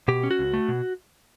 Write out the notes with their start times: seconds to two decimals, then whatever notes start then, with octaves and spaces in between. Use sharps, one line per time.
0.08 B2 G4
0.24 C#4
0.31 F#4
0.39 C#2
0.54 A3
0.69 B2